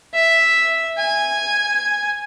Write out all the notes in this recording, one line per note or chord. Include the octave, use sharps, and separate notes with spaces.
E5
G#5